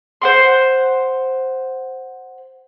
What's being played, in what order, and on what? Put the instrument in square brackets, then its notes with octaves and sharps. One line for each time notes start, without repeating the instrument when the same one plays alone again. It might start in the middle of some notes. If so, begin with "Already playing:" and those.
[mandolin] C5 F#5 C6